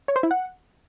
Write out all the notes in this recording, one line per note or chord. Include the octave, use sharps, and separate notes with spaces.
C#5
C5
E4
F#5